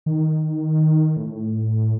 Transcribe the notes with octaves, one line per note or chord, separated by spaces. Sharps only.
D#3
A2